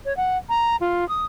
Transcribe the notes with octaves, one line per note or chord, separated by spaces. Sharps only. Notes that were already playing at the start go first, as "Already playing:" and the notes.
C#5
F#5
A#5
F4
D#6